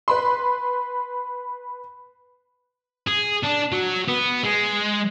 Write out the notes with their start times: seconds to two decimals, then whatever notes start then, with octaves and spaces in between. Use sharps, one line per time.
0.08 B4 B5 C6
3.08 G#4
3.44 D4
3.72 F#3
4.08 B3
4.44 G#3